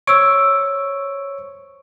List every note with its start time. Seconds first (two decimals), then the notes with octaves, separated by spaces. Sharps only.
0.07 C5 C#5 C#6 E6 D7